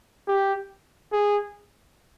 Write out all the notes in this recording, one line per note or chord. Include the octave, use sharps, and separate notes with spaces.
G4
G#4